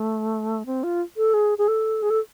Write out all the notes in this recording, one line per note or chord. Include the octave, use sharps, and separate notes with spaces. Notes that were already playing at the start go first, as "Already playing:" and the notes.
Already playing: A3
C4
F4
A4
G#4
G#4
A4
G#4
A4